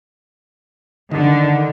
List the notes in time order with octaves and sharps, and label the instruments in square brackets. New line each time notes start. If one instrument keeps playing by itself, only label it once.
[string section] D3 [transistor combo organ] D#3